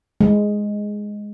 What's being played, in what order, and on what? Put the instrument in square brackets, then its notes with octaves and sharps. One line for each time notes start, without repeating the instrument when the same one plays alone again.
[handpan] G#3